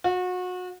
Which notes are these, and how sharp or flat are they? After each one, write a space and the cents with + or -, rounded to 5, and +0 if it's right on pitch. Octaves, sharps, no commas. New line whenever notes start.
F#4 -30